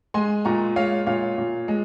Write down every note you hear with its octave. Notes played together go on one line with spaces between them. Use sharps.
G#3 G#5 C6
A#2 A#5 C#6
G#3 C#5 F5
A#2 C#5 F5
A#2
G#3